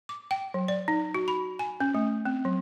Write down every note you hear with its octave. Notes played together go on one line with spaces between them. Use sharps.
D6
G5
F#3
D5
D#4
F#4
B5
G#5
C#4
A3
C4
F#3